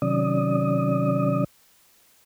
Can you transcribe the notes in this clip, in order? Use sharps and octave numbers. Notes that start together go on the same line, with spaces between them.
C3 D#3 F#3 C#4 D5 D#6